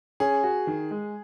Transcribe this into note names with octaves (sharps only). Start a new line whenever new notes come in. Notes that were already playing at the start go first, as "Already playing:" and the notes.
C#4 G#4
F#4
D#3
G#3